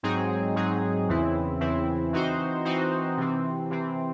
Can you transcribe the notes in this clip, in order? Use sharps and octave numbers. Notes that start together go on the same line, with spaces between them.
G#2 F#3 C4 D#4 G#4
G#2 F#3 C4 D#4 G#4
E2 C#3 E3 C4 E4
E2 C#3 E3 C4 E4
E3 C4 D#4 F#4 C5
E3 C4 D#4 F#4 C5
C3 E3 C4
C3 E3 C4